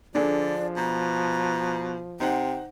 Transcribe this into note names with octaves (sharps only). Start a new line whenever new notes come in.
D3 F3 D4 G#4 A4 D5
B2 A#5
C3 D#4 C5 F#5 G5